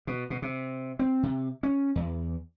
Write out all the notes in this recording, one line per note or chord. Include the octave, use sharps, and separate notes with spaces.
B2
B2
C3
C4
C3
C#4
E2